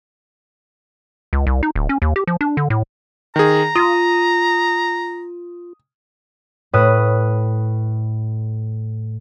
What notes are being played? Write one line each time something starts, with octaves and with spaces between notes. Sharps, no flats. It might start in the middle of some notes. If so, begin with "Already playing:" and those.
C#2
C2
D#4
D1
C#4
D#2
G4
F3
D4
D3
A2
D#3 G#4 A#5
F4 D#6
A2 B4 D#6 F#6